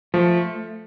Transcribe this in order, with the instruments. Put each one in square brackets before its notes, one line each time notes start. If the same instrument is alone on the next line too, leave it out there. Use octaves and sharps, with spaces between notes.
[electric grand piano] F3 [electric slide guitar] A3